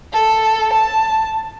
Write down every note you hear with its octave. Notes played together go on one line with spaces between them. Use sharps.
A4
A5